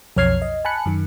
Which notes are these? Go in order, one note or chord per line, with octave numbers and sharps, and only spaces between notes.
B1 F2 C#5 F6 G#6 C7
D#5
G#5 A5 B5 F#6 C#7
F#2 D#3